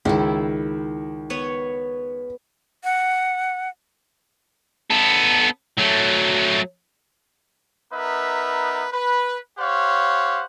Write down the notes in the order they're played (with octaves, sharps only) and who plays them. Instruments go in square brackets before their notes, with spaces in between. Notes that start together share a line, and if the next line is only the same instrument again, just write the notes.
[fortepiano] C#2 [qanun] D#3 E4
[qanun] B3 B4 C#5
[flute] F#5
[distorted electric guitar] B3 A4
F#3 A3
[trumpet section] B3 D#4 A#4 B4 E5
B4
G4 C5 C#5 F5 F#5